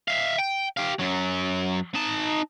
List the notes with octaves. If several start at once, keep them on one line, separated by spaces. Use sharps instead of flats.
E5 F5
G5
G4 F5
F#2 F#3
D#4 A5